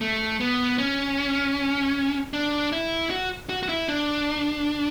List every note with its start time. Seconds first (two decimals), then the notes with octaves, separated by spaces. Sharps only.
0.01 A3
0.40 B3
0.78 C#4
2.33 D4
2.72 E4
3.10 F#4
3.49 F#4
3.63 F#4
3.69 E4
3.88 D4